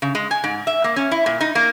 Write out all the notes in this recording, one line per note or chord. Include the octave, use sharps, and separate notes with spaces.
C#3
G#3
G#5
G#2
E5
A#3
C#4
E4
A#2
D#4
A#3